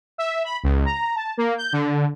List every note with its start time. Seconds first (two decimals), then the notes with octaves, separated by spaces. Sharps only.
0.18 E5
0.44 B5
0.64 C#2
0.86 A#5
1.15 A5
1.38 A#3
1.58 G6
1.73 D3